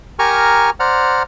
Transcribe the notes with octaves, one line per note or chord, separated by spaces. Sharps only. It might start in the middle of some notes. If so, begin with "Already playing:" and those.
G4 A#4 G#5 A#5 C#6 F6
C5 D5 F#5 A#5 F6